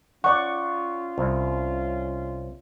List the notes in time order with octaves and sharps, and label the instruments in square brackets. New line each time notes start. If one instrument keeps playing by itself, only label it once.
[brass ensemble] C#4 F4 [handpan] D5 F#5 [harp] C#6
[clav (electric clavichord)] C2